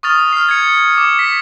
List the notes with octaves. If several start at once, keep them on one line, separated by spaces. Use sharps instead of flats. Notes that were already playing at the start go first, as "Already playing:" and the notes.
C#6 D#6 F6 A6 F7
F6 C7
G#6 C#7
D6
B6